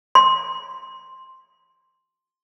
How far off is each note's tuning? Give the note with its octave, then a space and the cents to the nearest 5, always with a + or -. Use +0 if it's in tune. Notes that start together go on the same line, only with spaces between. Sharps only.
C6 +5